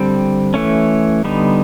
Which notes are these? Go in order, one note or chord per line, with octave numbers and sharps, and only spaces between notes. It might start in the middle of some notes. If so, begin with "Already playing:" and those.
Already playing: D3 G3 C4
E3 A3 C#4
D3 G3 B3 D#4